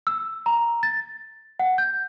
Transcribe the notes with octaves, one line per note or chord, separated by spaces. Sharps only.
E6
A#5
A6
F#5
G6